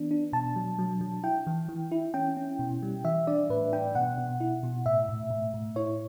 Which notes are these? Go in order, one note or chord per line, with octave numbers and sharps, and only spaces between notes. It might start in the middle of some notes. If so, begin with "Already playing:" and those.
Already playing: E3 B3 D4
D4
B2 A5
F#3
F#3
F#3
E4 G5
E3
E3
E4
C#4 G5
C#4
B2
G3
E3 E5
D4 D5
A2 B4
D4 G5
B2 F#5
B2
E4
B2
A2 E5
A2
A2
A2
E4 C#5